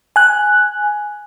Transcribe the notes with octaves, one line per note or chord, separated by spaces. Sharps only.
G#5 F#6